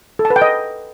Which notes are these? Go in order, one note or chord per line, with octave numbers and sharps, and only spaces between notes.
A4
A5
B4
G5
D#5